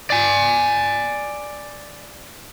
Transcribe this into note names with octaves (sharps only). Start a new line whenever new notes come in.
D5 G#5